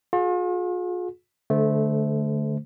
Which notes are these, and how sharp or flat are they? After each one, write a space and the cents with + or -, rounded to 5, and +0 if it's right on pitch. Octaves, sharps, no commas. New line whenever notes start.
F4 +45 G#4 +25
D3 +0 A3 -20 C5 -25